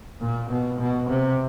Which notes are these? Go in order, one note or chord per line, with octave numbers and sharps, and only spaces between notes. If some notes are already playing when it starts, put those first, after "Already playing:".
A#2
B2
B2
C3